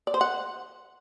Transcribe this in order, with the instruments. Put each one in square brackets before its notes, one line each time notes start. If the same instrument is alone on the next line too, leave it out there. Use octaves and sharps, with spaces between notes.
[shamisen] D5
C5
F#5